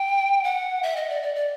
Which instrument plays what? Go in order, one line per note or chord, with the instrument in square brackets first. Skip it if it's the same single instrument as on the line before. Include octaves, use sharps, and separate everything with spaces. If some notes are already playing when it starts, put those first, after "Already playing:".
Already playing: [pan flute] G5
F#5
E5
D#5
D5
D5
D5